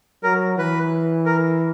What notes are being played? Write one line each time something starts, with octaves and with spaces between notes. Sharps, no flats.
F#3 A#4
E3 B4
A#4